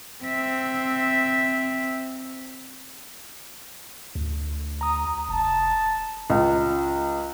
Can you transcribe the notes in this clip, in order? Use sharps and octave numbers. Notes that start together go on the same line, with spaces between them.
C4 E5
D2
A#5 D#6
F1 A5
C#2